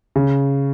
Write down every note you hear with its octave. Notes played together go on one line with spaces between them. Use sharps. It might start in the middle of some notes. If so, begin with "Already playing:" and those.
C#3